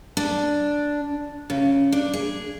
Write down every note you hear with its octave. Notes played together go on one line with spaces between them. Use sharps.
D4
C#3
D4
G#4